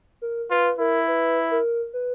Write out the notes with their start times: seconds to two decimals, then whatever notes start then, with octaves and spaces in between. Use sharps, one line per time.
0.22 A#4
0.50 F4 B4
0.78 E4 A#4
1.08 B4
1.51 A#4
1.93 B4